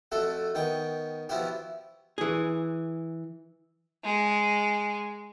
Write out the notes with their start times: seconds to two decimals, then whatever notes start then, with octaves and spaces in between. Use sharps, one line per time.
0.12 F2 A3 F#4 A4
0.55 D#3 B3 G5 C#6
1.29 F3 B3 E4 F#4 G4
2.18 E3 G#4
4.04 G#3